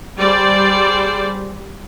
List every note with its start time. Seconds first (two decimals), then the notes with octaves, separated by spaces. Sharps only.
0.17 G3 G#4 C5 D5